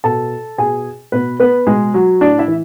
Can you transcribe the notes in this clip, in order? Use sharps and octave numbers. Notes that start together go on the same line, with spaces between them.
B2 A4 A5
B2 G#4 G#5
B2 B3 B4
B3 B4
B2 G#3 G#4
F#3 F#4
A2 D4 D5
E4 E5
E3